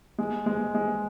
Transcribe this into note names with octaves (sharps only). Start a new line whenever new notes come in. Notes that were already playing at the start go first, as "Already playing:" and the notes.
G#3
G#3
G#3